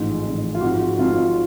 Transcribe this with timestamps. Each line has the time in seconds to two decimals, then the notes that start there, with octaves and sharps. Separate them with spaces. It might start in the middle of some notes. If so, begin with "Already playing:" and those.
Already playing: A1 G#2 F3
0.24 A1 G#2 F3
0.55 F4
0.61 G#1 G#2 F3 F#4
0.98 G#1 G#2 F3 F4